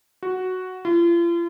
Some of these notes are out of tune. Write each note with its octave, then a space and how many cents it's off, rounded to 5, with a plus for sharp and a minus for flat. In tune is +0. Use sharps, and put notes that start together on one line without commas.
F#4 +0
F4 -40